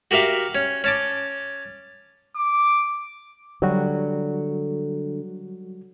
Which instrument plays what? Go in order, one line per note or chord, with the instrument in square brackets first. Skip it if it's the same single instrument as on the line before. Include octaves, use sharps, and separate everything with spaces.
[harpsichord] F#4 G4 A#4 E5 F5
C#4
C#4 A5 D6
[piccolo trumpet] D6
[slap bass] D3 [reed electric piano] F#3 G3 F#4